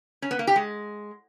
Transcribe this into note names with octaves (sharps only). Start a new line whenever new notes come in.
C#4
B3
A#3
G4
G#3